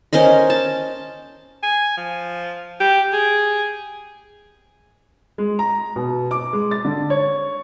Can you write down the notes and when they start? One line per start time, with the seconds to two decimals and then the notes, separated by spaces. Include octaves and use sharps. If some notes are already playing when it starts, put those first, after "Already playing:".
0.13 C#4 A#4 C5 D#5
0.50 A5
1.63 G#5
1.97 F3
2.80 G4
3.13 G#4
5.38 G#3
5.59 A#5
5.96 B2
6.31 D6
6.53 G#3
6.71 A6
6.85 D3
7.10 C#5